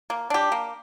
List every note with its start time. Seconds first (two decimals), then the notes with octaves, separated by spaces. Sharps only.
0.10 A#3
0.30 D4 G4
0.52 A#3